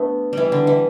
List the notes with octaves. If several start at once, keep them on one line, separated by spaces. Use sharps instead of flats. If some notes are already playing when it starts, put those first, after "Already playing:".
Already playing: A3 B3 D4
E3 G3
D3
E3